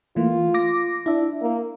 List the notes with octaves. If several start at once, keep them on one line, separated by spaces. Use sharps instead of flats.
E3 A3 A#3 F4
D6 A#6
D4 E4 E5
A#3